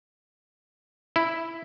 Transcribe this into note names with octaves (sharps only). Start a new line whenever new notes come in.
E4